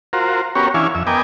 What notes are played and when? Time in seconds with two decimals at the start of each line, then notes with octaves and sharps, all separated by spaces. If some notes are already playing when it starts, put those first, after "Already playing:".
0.13 F4 F#4 A#4 C5
0.55 B3 C#4 F#4 G4 A#4 C#5
0.74 E3 C#4 D4 E4 F5 G#5
0.95 F2 E5
1.07 B3 A#4 D#5 G5 G#5 D6